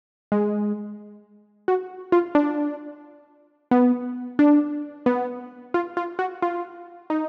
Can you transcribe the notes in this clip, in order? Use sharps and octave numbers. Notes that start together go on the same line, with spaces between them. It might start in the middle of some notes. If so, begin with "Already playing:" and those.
G#3
F#4
F4
D4
B3
D4
B3
F4
F4
F#4
F4
D#4